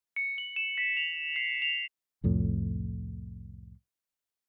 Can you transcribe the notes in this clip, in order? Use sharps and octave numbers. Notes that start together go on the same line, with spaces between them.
C#7
F#7
E7
B6
F7
C7
F7
C2 F2 A2